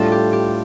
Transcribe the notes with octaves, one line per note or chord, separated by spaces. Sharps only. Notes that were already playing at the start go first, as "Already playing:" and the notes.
Already playing: A2 G3 D4 F4 A4
G4
G4